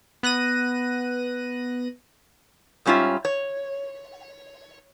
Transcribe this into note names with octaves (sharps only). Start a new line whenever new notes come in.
B3 F#6 A#6 D#7
G#2 G3 C#4 F4 E5
C#5